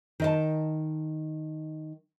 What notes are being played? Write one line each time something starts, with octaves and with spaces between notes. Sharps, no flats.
D#3 D#5 A5